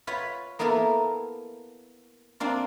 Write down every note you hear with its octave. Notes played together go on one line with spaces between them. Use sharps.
F4 B4 C#5 F#5
A#3 B3 E4 A4 A#4
A#3 C4 D4 F4